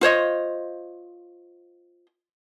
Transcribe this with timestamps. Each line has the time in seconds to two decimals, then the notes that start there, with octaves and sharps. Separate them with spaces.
0.01 F4 C5 C#5 D#5